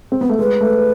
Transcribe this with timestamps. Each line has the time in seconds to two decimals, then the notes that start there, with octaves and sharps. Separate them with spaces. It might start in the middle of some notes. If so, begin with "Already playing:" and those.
0.12 C4
0.21 B3
0.29 A3
0.39 G#3 B4
0.61 A3